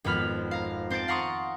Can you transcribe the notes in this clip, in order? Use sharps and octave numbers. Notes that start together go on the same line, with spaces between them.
G#1 F2 B3 B5 F6
F5 A#5
C4 C5 A5 A6 D7
F5 F#5 A#5 C6 C#6 D#6